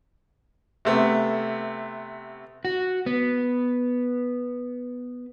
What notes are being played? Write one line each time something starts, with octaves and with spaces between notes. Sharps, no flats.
C3 A3 B3
F#4
B3